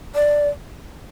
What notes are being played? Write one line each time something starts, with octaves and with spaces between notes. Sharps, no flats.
D5